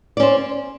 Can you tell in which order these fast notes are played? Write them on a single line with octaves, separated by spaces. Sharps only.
D5 C#4 C5